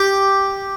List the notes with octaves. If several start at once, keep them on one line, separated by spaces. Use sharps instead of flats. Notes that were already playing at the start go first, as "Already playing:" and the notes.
Already playing: G4